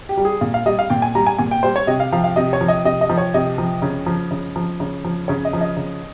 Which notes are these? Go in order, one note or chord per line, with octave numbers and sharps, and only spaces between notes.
G4
G3
G#4
A#2 F5
F5
G3 D#5
F5
A#2 G5
G#5
G3 A#5
G#5
A#2 G#5
G5
G3 C5
C#5
C3 D#5
F5
F3 F5
F5
C3 D#5
C#5
F3
D#5
C3 D#5
D#5
F3
C#5
C3 D#5
F3
C#3
F3
C#3
F3
C#3
F3
C#3 C#5
D#5
F3
D#5
C#3